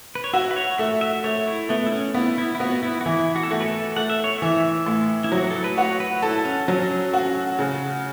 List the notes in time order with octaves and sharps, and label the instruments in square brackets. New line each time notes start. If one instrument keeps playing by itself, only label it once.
[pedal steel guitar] B4
C#5
[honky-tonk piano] F#4 [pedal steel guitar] E5
[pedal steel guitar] B4
C#5
[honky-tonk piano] A3 [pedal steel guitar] E5
[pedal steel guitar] E5
[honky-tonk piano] A3 [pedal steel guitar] C#5
[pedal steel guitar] E4
[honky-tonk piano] A3 [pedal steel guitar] B3
[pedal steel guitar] E4
C#4
[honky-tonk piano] B3 [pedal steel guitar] E4
[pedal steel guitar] E4
E4
[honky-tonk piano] B3 [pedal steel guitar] F#4
[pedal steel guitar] E4
F#4
[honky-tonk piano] E3 [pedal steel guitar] E4
[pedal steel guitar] F#4
A4
[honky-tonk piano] A3 [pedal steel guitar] F#4
[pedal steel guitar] B4
A4
[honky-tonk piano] A3 [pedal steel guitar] F#5
[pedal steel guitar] E5
C#5
[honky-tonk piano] E3 [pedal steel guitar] E5
[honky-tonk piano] A2
[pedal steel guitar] E4
[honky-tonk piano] F#3
[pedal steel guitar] F#4
A4
B4
[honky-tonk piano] F#4 [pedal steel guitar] C#5
[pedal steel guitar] B4
[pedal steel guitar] E4 [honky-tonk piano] A4
[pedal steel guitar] C#4
[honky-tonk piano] F#3 [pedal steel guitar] C#4
[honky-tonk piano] F#4
C#3